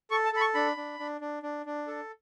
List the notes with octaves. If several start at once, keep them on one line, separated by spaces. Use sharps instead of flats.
A4 C#6
A5
A4 B5
C#6
D4 B5
D4
D4
D4
D4
D4
A4